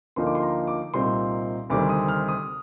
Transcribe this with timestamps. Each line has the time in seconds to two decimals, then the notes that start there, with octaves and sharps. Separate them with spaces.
0.16 D2 D3 F3 A#3 D#4 C6
0.27 D6
0.35 C6
0.42 A#5
0.67 D6
0.94 C2 A#2 G3 C4 D#4 C6
1.70 D2 C3 D#3 G3 C4 D6
1.89 D#6
2.08 F6
2.28 D#6